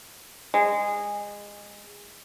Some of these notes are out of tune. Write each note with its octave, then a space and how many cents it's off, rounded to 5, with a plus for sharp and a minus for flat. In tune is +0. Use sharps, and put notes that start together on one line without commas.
G#3 -20